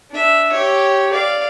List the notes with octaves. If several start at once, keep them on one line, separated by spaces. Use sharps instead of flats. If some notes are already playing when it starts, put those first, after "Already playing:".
D4 E5
G4 C#5
D5 F5